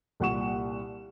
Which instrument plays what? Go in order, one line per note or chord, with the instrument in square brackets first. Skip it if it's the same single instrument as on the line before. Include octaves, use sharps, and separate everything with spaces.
[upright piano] C2 A#2 F#5 C#6 E7